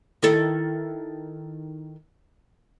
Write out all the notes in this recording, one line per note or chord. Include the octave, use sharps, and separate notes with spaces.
D#3 E4 A4